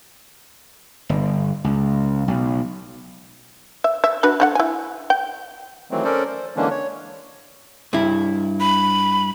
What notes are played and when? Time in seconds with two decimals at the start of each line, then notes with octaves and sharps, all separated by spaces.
1.09 G1
1.64 C#2
2.28 B1
3.84 E5
4.04 E5
4.23 D4 F#4 B4
4.40 D3 F#4 F#5
4.55 E4 G#5
5.10 G5
5.91 D#3 E3 F#3 A3 C4
6.04 C#4 A4 A#4 C5 D5
6.27 C5
6.56 D3 E3 G#3 A#3 C#4 D4
6.71 C#5
7.93 G2 E4
8.60 B5